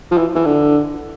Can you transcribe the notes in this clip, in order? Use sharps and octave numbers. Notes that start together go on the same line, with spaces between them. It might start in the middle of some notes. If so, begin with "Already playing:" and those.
F3
E3
E3
D3